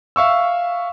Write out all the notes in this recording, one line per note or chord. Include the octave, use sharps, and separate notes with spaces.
E5 F5 C#6 E6